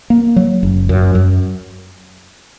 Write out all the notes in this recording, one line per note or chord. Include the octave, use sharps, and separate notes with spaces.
A#3
F#3
F#1
F#2
F#2